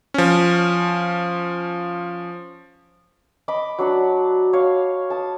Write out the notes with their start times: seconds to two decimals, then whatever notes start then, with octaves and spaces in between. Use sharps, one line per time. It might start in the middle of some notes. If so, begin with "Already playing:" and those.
0.14 F3 C#4
3.48 D#5 B5 D6
3.79 F#3 D4 F#5
4.53 C#5 F5
5.10 A5 D#6